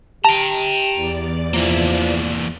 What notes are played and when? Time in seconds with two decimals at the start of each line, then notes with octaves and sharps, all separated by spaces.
0.25 G4 G5 A5 A#5
0.94 E2 D5
1.53 E3 F3 A#3